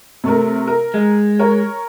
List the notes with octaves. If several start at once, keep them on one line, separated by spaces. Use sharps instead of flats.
C3 A3 A#4
A#4
G#3
A#4 C#5